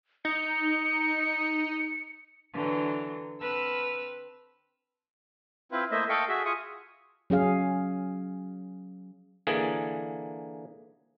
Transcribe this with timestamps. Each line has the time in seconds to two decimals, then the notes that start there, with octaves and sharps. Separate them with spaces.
0.25 D#4 C#7
2.54 D3 E3 F#3
3.41 C4 B4 A5 E6 F6
5.72 C4 E4 F4 B4
5.91 A3 A#3 E4 C5 D#5 E5
6.09 A4 D#5 F5 G5 C#6
6.28 F#4 G#4 E5
6.45 F4 G#4 C#6 D#6
7.30 F#3 C#4 G#4 F5
9.47 D3 E3 A#3 G#4